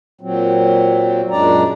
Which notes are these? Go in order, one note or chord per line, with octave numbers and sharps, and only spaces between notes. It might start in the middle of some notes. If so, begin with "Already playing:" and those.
A#2 F#3 C4
F#2 A#2 G#3 D4 D5 A#5